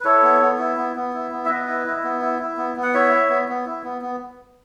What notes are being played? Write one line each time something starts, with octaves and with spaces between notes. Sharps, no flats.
B4
E4 A4 C#5
B3
B3
E4
B3
B3
E4
B3
E5
B3 B4 D#5
E4
E4
B3
E4
E4
B3
B3
F#5
E4 C#5 E5
E4
B3
B3
E4
B3
B3